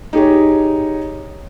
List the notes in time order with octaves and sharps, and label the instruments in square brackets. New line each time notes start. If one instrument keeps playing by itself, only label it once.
[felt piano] D#4 G4 G#4 C#5